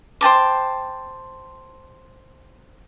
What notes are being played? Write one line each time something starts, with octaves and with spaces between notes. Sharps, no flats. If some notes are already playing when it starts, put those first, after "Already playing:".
C5 G5 A5 D6